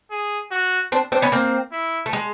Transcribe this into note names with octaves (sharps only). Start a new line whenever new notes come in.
G#4
F#4
C4 D4
C4 D4
B3 C#4
A#3 C4
E4
A3
G#3